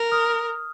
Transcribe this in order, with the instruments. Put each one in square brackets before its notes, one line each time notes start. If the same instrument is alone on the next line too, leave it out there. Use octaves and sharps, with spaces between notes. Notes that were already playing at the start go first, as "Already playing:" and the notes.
Already playing: [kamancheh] A#4
[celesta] D#6 F6